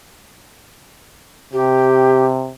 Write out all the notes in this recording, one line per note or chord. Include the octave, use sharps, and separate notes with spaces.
C3 G4